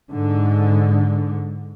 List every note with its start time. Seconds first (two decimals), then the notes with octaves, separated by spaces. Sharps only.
0.11 G#2 D3